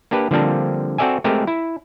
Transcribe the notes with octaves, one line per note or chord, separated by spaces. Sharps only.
A#3 D4 G4 B4
D3 F3 G3 A#3 C4 D4
C4 F#4 A4 D5 E5 G#5
G#3 A3 C4 G4 A#4
E4